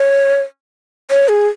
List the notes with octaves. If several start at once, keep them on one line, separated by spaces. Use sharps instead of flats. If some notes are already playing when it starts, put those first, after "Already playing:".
Already playing: C#5
C#5
G#4